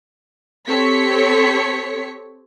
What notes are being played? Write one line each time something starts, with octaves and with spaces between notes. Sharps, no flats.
C4 G4 A4 C#5 B6 C#7